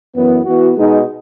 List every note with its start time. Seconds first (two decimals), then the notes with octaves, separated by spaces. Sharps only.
0.14 F#2 E3 B3
0.45 E3 B3 F#4
0.77 B2 G#3 D#4